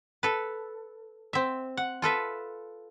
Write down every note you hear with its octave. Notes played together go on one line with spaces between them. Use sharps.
A4 B4
C4 E5
F#5
F4 A4 B4 E5